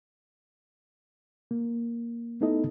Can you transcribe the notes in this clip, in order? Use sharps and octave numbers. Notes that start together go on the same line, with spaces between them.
A#3
A3 B3 D#4 E4 A4 D#5